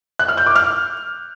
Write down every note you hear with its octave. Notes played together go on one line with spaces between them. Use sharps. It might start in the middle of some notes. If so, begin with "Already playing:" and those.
F#6
F6
G6
D6
F6